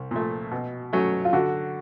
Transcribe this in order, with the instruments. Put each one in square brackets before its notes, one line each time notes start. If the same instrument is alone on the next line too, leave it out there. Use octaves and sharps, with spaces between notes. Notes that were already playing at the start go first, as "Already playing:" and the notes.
Already playing: [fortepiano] C2
A#2 F3 A3
B2
F#3 A3 C#4
[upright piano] F4
[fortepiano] D3 [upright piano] F#4